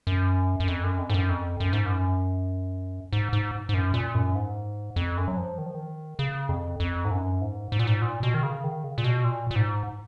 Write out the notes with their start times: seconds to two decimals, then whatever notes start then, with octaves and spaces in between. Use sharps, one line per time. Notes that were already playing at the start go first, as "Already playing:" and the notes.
0.07 F#2
0.60 F#2
0.68 F2
0.83 F#2
0.98 F2
1.10 G#2
1.14 F#2
1.29 F2
1.60 F#2
1.73 G#2
1.86 F#2
3.13 G#2
3.33 G#2
3.69 G#2
3.74 F#2
3.94 A#2
4.15 F#2
4.35 G#2
4.96 F2
5.17 F#2
5.28 F#3
5.37 F3
5.58 D#3
5.66 F3
5.75 D#3
6.19 C#3
6.49 F2
6.80 F2
7.05 G#2
7.11 F#2
7.41 G#2
7.72 G#2
7.79 A#2
7.87 G#2
8.02 A#2
8.23 B2
8.34 D#3
8.43 C#3
8.64 D#3
8.84 C#3
8.98 A#2
9.04 B2
9.24 A#2
9.51 A#2
9.56 G#2